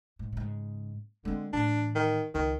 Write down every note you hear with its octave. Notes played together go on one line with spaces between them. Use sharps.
G#2
G#2 C#3
D3 G#3 C4
A2 E3 D4
D#3
C#2 D#3